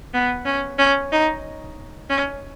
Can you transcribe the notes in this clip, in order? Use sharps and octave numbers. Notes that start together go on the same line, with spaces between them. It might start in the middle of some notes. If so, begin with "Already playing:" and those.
B3
C#4
C#4
D#4
C#4